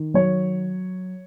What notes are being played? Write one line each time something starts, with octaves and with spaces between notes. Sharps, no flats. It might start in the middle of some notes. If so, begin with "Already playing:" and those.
Already playing: D#3
F#3 C#5